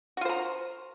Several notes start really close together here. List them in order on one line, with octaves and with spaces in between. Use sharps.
F#4 F4 C5 A#5